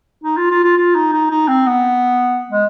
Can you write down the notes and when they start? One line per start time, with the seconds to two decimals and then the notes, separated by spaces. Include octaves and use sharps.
0.24 D#4
0.37 F4
0.50 F4
0.64 F4
0.77 F4
0.95 D#4
1.13 D#4
1.31 D#4
1.48 C4
1.67 B3
2.51 G#3